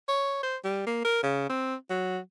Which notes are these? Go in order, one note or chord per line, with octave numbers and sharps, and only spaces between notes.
C#5
C5
G3
A#3
A#4
C#3
C4
F#3